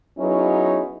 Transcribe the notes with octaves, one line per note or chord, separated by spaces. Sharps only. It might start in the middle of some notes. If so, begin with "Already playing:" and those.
F#3 B3 C#4 D#4 E4 G#4